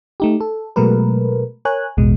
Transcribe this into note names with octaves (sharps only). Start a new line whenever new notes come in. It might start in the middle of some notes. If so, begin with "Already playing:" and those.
A3 D#4 G4
A4
B2 F#3 G#3 A3 A#4 B4
A#4 C#5 G#5 F#6
A1 E2 B2 G#3